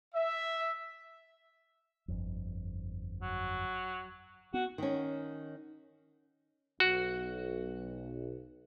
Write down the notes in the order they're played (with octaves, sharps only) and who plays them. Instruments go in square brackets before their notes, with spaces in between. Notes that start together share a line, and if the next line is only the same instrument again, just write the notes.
[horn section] E5
[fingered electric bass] G1 F2
[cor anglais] F#3
[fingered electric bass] B3 [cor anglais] F#4
[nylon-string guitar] D#3 C#4
[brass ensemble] B1 [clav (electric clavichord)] F#4